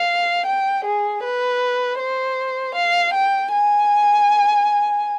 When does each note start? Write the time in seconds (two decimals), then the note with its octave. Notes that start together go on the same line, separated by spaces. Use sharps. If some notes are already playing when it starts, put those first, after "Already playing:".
Already playing: F5
0.46 G5
0.85 G#4
1.23 B4
1.98 C5
2.75 F5
3.13 G5
3.51 G#5